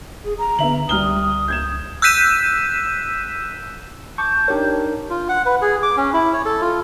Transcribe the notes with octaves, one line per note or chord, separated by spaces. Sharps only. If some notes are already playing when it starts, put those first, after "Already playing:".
D#1 G#4
A#5
D3 B3 E5 F#7
C#2 G3 D#6 F6 G7
G6 G#6 E7
E6 F#6 G6 B6 D#7 E7
A5 C#6 D6 G6
D4 D#4 G4 A#4 C#5
F4
F#5
B4
G#4
D6
C#4
E4
C#5
A4
F4